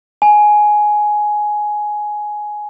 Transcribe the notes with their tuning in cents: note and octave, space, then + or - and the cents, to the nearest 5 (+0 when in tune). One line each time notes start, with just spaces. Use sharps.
G#5 +10